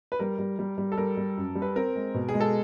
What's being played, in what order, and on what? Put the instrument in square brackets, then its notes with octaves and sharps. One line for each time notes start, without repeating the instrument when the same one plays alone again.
[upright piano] B4
[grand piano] G3 [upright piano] A#4
[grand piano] G3
G3
G3
[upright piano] A4
[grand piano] G3 [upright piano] A#4
[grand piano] G3
F#2
G3
[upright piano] B4
[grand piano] C4 [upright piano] A#4
[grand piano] G#3
B2
[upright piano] G#4
[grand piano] G#3
[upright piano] A4